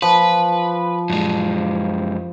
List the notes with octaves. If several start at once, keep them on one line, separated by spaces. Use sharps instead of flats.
F3 B4
F#2 G#3